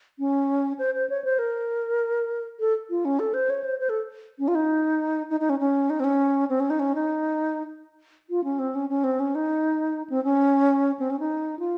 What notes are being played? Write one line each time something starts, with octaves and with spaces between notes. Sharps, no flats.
C#4
C5
C5
C#5
C5
A#4
A4
F4
C#4
A4
C5
C#5
C5
C5
A4
C#4
F4
D#4
D#4
D#4
C#4
C#4
D#4
C4
C#4
C4
C#4
D#4
C#4
D#4
F4
C#4
C4
C#4
C#4
C4
C#4
D#4
C4
C#4
C4
C#4
D#4
F4